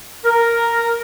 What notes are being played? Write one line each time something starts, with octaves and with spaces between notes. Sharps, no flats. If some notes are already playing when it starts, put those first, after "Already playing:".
A#4